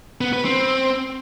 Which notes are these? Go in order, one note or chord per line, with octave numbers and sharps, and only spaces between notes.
B3
B4
C4